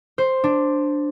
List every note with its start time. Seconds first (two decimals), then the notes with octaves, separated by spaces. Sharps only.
0.18 C5
0.44 D4